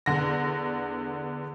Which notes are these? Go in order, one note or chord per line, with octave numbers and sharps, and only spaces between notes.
E2 D3 A#6